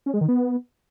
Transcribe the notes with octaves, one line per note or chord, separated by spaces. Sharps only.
C#4
G#3
D#3
B3